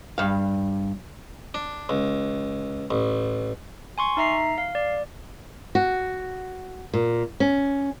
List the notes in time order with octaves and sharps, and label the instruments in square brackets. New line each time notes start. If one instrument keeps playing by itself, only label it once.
[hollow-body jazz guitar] G2 F5
[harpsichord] D4
C#2
A1
[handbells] G#5 C6 C#6
D#4 E5 A#5 C7
F5
D5
[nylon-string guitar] F#4
A#2
C#4